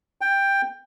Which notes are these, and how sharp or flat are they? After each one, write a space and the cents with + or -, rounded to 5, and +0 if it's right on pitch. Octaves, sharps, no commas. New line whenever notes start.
G5 +10